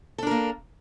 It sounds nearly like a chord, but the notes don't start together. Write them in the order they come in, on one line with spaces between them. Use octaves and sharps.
A4 D4 A#4 A#3